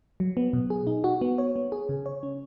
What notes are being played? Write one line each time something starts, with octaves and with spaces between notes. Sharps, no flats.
F#3
B3
B2
G#4
D#4
F#4
B3
C#5
B3
G#4
C#3
C#5
C#4